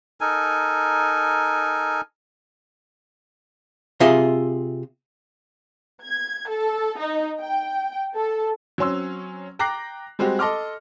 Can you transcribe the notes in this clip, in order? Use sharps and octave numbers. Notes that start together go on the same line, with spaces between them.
D#4 A4 A#4 G#5
C3 F4 G#4 D#5 E5
G#6
A4
D#4
G5
A4
F#3 C4 C#4 C6 E6
G5 A#5 D6 F#6 A#6 C7
G3 G#3 C4 F#4 G4
A4 D#5 C6 D6 F6